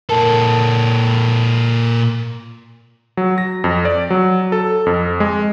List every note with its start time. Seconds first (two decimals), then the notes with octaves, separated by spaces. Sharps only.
0.09 A#2 A4 A#4 A5
3.17 F#3
3.38 A#6
3.64 F2
3.85 D5
4.11 F#3
4.52 A4
4.86 F2
5.20 G#3